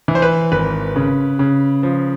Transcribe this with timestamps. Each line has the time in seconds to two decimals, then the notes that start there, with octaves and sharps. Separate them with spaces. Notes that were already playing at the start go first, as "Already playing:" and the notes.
0.08 E3
0.15 C5
0.22 B4
0.52 G#1 B4
0.96 C#3
1.39 C#3
1.83 F3